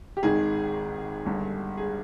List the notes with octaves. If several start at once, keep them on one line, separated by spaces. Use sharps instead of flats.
G4
G#1 G#2 D#3 G#4
G1 G2 D3
G#4